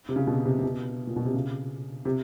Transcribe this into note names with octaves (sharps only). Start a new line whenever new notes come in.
C3
C#3
B2
C3
C3
B2
A#2
B2
C3
C#3
C3